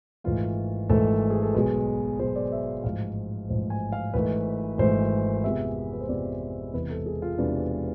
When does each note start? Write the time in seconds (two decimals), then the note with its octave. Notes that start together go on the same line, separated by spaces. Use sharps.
0.24 G#1 G#2 E3 A3 F4
0.89 G#1 G#2 E3 A3 A4
1.30 G#4
1.43 A4
1.54 B1 B2 G#3 B4
2.19 B1 B2 G#3 C5
2.36 D5
2.52 E5
2.68 F5
2.84 A1 G#2 F3 F5
3.49 A1 G#2 F3
3.70 G#5
3.92 F5
4.14 G#1 G#2 E3 A3 B4
4.78 G#1 G#2 E3 A3 C5
5.44 F2 C3 G#3 B3 E5
5.93 B4
6.01 C5
6.09 F2 C3 G#3 B3 D5
6.73 E1 E2 C3 E3 B4
6.90 A4
7.06 G#4
7.22 F4
7.38 E1 E2 C3 E3 D4